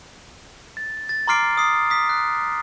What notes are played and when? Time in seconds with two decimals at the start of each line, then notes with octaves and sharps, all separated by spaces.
0.77 A6
1.09 A6
1.27 A#5 C6 D6 F6 C7 D7
1.57 D#6 C7
1.90 D#6 B6
2.09 F#6